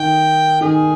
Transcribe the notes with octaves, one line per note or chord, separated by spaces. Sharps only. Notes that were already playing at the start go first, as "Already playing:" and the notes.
Already playing: D#3 G5
D#3 G#4